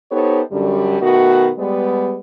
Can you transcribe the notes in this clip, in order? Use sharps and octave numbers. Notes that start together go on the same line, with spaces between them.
B3 D#4 G4 A4 C5 C#5
F#2 D3 G3
B2 D#3 A3 B3 F#4
G3 G#3 B3